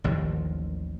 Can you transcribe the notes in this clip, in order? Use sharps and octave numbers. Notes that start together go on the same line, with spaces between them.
A1 D#2 D#3 F3